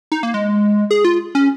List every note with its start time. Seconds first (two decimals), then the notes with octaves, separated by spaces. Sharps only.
0.12 D#4
0.23 A#3
0.34 G#3
0.91 G#4
1.04 F4
1.35 C#4